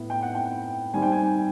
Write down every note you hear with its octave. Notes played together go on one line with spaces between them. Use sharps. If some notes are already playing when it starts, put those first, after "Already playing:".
Already playing: A2 B3 E4
G5
F#5
G5
D#3 G3 C4 G#5
G5
G#5